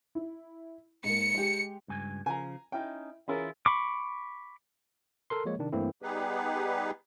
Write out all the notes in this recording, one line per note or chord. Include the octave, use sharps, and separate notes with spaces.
E4
G#2 G#3 A#3 C#7
G#3 G4
C#2 G2 G#5
C#3 F3 G#5 A#5
C#4 D#4 E4 G5
E3 C#4 E4 F4 G#4 A#4
B5 C#6 D6
A4 A#4 C6
F3 G#3 A#3 C#5
C3 D#3 D4
G2 E3 A3 A#3 C4 E4
G3 B3 D#4 G4 G#4 B4